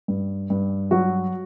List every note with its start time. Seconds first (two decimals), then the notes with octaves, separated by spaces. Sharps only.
0.08 G2
0.50 G2
0.91 F#3 F#4